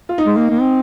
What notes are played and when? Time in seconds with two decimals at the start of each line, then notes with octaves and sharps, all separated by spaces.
0.09 F4
0.18 D#4
0.26 G#3
0.37 A#3
0.50 A#3
0.61 C4